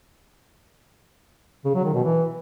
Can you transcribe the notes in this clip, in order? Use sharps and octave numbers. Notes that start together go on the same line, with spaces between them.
C#3
F#3
D#3
B2
E3